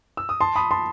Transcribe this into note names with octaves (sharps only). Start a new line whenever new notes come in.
E6
D#6
A5 C6
B5 D#6
A5 C6